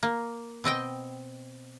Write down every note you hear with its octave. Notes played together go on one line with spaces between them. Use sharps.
A#3
B2 C4 D#5 G5